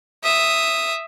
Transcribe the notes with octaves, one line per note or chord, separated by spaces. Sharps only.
E5 D#6